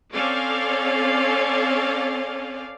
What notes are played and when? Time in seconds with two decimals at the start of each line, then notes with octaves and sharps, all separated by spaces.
0.13 C4 C#4 A4 D5 F5